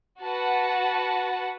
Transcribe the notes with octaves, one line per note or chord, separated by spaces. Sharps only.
F#4 B4 F#5 A5